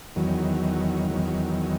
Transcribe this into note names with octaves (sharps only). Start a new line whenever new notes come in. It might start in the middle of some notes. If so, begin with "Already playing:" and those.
E2 D#3 F#3
E2 D#3 F#3